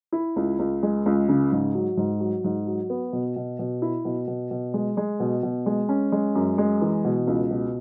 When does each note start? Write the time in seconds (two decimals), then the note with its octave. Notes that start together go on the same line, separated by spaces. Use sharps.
0.12 E4
0.36 C#2
0.59 C#2
0.83 G#3
1.06 C#2
1.29 C#3
1.52 G#2
1.74 F#3
1.97 G#2
2.20 F#3
2.44 G#2
2.67 F#3
2.90 B3
3.13 B2
3.36 B2
3.59 B2
3.82 E4
4.05 B2
4.27 B2
4.51 B2
4.74 G#3
4.97 G#3
5.20 B2
5.43 B2
5.66 G#3
5.89 C#4
6.12 G#3
6.35 F#2
6.58 G#3
6.82 E3
7.04 B2
7.27 C#2
7.51 B2